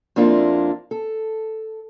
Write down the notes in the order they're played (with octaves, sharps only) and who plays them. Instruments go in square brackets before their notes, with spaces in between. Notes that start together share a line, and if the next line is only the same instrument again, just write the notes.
[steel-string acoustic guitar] F2 A#3 D4 E4 F4
A4